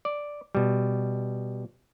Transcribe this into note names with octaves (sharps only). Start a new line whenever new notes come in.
D5
B2 G3